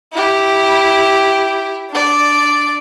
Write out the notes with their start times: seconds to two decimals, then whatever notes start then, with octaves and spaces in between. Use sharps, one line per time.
0.13 E4 G4
1.90 D4 D5